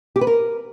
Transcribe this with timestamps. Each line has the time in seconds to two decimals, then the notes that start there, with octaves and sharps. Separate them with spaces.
0.16 G4
0.21 B4
0.27 A#4